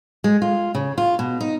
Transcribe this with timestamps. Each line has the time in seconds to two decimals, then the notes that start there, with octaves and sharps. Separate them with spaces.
0.24 G#3
0.42 F4
0.75 C#3
0.98 F4
1.19 B2
1.41 D#4